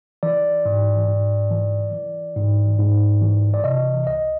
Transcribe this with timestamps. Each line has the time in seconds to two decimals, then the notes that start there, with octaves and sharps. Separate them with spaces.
0.23 E3 D5
0.65 G#2
1.08 G#2
1.51 E3
1.93 E3
2.36 G#2
2.78 G#2
3.21 E3
3.54 D5
3.64 C3 D#5
4.07 C#2 D#5